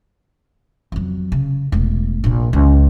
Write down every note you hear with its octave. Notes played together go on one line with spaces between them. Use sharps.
F2 F#3
C#3
E1 A3
A#1 A#2
C#2